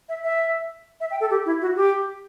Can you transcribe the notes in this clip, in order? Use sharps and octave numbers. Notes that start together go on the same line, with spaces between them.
E5
E5
E5
G5
A4
G4
E4
F#4
G4